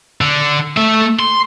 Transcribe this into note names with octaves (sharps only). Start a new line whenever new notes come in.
D3
A3 E5
C6